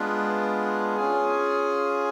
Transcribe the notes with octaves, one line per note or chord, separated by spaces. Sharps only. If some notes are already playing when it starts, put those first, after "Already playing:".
Already playing: G#3 B3 D4 F4 B4
C#4 F4 G#4